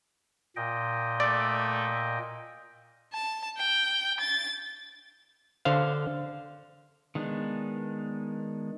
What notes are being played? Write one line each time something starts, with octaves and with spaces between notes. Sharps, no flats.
A#2 D#5 G5
A3 D5
A5
G5
A6
D3 C5 F5
D#3 G#3 B3 D4